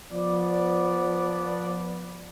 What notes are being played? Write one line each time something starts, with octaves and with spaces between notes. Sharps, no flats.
F3 B3 D5